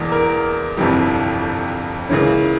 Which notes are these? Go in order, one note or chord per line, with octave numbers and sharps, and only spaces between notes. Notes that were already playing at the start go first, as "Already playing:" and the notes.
Already playing: E1 E2 E3 A#3
A#4
G1 F2 C3 E3 G3
C#2 C#3 E3 A#3 C#4